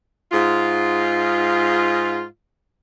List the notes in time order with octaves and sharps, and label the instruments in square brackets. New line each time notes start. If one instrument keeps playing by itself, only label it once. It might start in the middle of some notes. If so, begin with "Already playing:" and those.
[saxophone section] G#2 F4